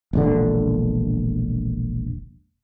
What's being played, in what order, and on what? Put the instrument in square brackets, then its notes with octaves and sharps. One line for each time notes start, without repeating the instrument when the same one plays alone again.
[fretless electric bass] E1 A#1 D3